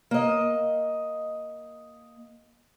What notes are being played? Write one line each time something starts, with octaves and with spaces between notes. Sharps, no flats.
A#3 D#5